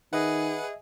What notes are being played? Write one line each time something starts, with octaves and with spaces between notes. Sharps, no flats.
D#3 G#4 B4 D#5 E5 F#5